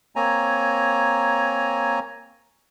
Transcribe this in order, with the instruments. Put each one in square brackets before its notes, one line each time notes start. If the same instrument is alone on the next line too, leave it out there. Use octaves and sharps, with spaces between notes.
[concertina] A#3 C4 C#5 G#5 A#5